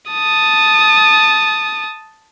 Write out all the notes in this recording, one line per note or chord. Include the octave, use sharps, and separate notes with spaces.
A5 D#6